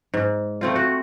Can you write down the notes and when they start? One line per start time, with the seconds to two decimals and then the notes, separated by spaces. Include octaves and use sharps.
0.14 G#2
0.61 A3 C4 F4
0.76 F#4